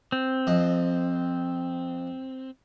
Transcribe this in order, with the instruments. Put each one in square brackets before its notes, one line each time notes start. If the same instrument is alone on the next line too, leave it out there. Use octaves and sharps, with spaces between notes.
[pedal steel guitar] C4
[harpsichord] F2 D#5